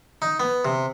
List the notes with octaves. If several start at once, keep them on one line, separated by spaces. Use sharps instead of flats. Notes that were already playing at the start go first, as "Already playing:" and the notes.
D#4
B3
C3